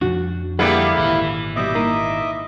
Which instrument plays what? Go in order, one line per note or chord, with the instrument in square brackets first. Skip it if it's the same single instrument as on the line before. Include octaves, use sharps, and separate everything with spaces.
[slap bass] F2 F3 D4 [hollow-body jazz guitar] F#4
[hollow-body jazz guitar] D3 A#3 G4 [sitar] G3 B3 G#4 [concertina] E4 F5
[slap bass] G#1 A#2 [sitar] E3
[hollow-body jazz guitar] B2 G3 [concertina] D#5 E5 D6
[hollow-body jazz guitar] A#3 D#4